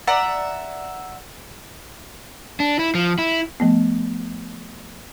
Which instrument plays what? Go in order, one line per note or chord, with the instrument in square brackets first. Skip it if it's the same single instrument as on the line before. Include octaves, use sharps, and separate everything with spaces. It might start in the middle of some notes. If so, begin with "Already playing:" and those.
[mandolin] D5 E5 F#5 A#5
[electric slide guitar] D4
E4
F3
E4
[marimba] F3 A3 B3